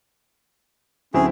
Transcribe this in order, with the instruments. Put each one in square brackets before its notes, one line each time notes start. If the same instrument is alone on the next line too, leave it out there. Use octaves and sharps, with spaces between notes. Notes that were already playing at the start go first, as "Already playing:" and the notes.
[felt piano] D2 F#3 [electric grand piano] C4 E4 F#4 [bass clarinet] C#4 [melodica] G#4